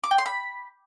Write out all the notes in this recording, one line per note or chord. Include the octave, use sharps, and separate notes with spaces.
D6
G5
C6
B5